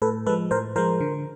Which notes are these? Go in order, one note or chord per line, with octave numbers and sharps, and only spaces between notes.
A2 A4 B4
F3 G#3 A4 B4
A2 A#4 C5
F3 G#3 A#4 C5
D3